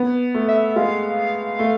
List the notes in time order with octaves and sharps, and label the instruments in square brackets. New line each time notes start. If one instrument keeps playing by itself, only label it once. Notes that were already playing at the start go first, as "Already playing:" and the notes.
Already playing: [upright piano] B3
A3
[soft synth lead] E5
[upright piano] G#3 [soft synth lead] F5
[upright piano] A3